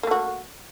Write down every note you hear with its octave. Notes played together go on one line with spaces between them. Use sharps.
A3 A#3 F#4